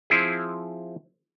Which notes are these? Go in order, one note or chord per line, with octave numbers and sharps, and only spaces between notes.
F3 C4 E4 G#4